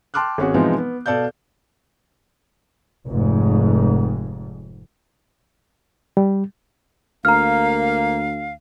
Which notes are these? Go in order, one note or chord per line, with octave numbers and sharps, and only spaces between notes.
G5 A5 C6 D6 F6 F#6
G#1 C#4 F#4 G#4
B2 E3 F3 G#3 C4 D#4
B3
B2 A4 D5 F5 G6
F1 F2 G#2
G3
D2 A#3 F5 A#5 F6